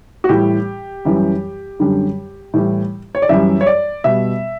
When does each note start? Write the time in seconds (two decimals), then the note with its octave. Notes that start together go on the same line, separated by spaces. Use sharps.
0.24 F#4
0.29 A2 E3 G3 G4
1.05 F#2 E3 G3
1.79 F#2 D3 G3
2.54 A2 E3 G3
3.15 C#5
3.22 D5
3.29 F#2 E3 G3 E5
3.61 C#5
3.66 D5
4.04 B2 G3 E5